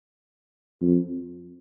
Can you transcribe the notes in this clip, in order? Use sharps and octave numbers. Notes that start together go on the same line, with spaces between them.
F2